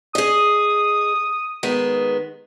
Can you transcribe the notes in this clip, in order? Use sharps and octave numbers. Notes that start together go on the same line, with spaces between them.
G#4 D#5 D#6
D#3 G#3 B3